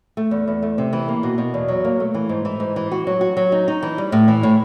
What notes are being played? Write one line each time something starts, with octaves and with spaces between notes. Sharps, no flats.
A3
E2
E2
A3
C3
E3
A#3
B2
B2
E2
F#3
A#3
A3
E3
G#2
E3
G#2
E3
F#4
F#3
F#4
F#3
D#4
D#4
E3
G3
A2
E3
A2